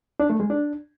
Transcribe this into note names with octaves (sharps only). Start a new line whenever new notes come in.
D4
A3
G#3
D4